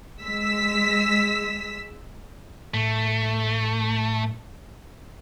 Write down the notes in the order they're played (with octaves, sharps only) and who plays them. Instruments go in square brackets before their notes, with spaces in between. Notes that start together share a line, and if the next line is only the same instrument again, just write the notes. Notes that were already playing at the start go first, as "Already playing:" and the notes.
[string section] G#3 E6 B6
[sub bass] A2 [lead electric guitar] A3